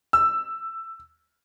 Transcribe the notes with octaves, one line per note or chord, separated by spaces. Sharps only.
E6